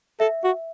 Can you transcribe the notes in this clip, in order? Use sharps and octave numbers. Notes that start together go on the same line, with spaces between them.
A4 E5
F#4